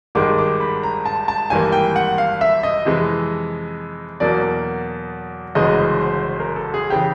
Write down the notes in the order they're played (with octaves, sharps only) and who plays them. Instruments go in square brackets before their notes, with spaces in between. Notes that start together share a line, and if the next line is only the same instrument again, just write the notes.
[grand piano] G#1 G2 D#3 G#3 D6
D6
B5
A#5
A5
A5
G#1 G2 E3 G3 A#3 G#5
G5
F#5
F5
E5
D#5
F2 C3 E3 G#3
E2 B2 F#3 A#3 D5
G1 F#2 C#3 E3 G#3 D#5
C5
C5
C5
A#4
A4
G#4
C#3 E3 G4